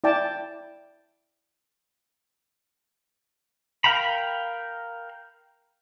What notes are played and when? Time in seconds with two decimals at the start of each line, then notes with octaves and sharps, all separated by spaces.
0.04 E4 D5 G5 A5
3.84 A#4 F5 G5 A#5 B5